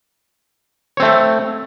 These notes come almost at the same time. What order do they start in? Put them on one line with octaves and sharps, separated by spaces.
C#5 C4 A3